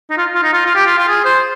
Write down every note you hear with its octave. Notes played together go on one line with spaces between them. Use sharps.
D#4
F4
F4
D#4
F4
F4
G4
F4
F4
G#4
C5